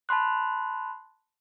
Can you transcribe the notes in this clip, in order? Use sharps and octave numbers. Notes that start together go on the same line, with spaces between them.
A5 B5 C6 F#6